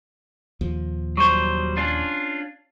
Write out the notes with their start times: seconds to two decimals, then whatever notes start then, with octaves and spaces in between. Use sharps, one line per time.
0.61 D#1 D#2 F3
1.17 F#3 G3 C5 C#6
1.77 C#4 D4 F4